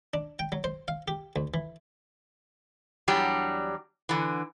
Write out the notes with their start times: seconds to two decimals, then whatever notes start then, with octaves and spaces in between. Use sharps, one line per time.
0.14 D4
0.39 G5
0.52 F#3
0.64 C5
0.88 F5
1.08 G4
1.36 D2
1.54 E3
3.08 E2 F#3 G3 D4 G4
4.09 D3 E3